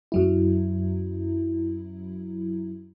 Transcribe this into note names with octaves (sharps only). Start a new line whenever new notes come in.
F#2 F#3 E4